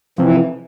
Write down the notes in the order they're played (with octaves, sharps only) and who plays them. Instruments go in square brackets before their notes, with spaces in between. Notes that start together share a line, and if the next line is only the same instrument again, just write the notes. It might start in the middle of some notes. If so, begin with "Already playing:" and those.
[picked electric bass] C3 F3 C4 [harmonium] E3